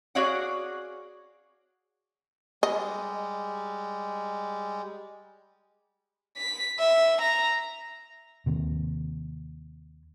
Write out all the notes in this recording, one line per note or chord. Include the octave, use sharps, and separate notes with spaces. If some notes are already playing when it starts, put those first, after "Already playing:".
F#4 G#4 C#5 D5 F5 F#5
G3 G#3 D#5
B6
E5
A#5
D#2 C3